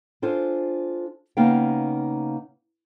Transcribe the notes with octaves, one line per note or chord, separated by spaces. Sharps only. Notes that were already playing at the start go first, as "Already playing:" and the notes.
D4 F4 A4 C5 G#5
C#3 A#3 B3 D#4 F5 G5